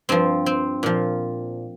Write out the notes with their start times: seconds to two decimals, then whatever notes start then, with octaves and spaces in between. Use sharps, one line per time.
0.09 G2 F3 C4
0.46 C4
0.83 A#2 F3